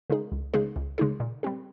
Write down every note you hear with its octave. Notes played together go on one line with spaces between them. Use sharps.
C#3 G#3 D#4 G#4
C#2
C#3 G#3 D#4 G#4
C#2
C#3 G#3 D#4 G#4
A#2
G3 C4 G4